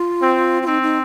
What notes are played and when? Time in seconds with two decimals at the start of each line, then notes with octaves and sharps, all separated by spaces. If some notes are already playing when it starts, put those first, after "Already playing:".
Already playing: F4
0.21 C4
0.62 F4
0.67 C4 D#4
0.82 D#4